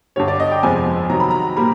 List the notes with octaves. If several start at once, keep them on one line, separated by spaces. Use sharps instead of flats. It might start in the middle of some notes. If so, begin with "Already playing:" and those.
G2 D3 G3 C#5
D5
D#5
G5
F2 C3 F3 G#3 B3 G#5
C3 D#3 F#3 A#5
B5
A#5
A#2 G3 A#3 B5